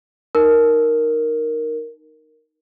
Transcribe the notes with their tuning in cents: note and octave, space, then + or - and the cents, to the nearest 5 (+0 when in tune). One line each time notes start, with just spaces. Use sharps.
D#4 -10 A#4 +0